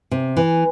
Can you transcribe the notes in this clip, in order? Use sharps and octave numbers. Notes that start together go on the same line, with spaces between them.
C3
E3